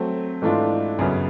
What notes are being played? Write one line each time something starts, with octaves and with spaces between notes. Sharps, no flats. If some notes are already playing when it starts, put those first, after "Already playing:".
Already playing: F#3 A3 C4
G#2 E3 A3 D4 F4
F#2 C#3 F#3 B3